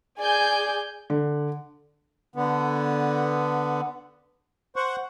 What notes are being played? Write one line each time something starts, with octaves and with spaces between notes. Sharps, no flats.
G#4 D5 G#5 G6
D3
D3 B3
C5 F#5 C#6